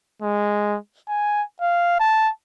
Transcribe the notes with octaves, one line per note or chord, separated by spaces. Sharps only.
G#3
G#5
F5
A5